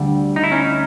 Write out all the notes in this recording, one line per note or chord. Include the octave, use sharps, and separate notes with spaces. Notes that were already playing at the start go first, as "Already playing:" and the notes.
Already playing: D2 D3 G3
D#4
E4
C#4 D#4